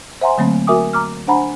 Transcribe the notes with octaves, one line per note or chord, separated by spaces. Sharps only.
C5 E5 F#5 G#5 A#5 C6
D3 F#3 A3 A#3 C4
F#4 A#4 E5 G#5 D6 D#6
A#5 D6 F6
D4 C5 F#5 G#5 A#5 B5